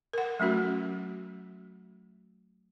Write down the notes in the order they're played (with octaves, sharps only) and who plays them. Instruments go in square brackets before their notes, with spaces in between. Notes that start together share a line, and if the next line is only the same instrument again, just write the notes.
[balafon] A#4 F#5
F#3 A3 C#4 F#4